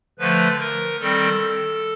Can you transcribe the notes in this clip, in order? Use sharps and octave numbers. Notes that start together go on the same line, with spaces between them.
D3 F3 A3 B4
A#4
D#3 G3 C4 A4